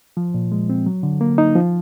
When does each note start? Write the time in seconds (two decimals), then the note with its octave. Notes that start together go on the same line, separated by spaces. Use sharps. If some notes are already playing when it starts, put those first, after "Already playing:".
0.17 F3
0.34 A#2
0.52 G#3
0.70 C4
0.86 F#3
1.03 D3
1.21 A#3
1.38 D#4
1.55 F3